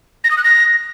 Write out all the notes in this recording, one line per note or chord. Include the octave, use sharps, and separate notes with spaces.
A#6
D#6
F#6
A#6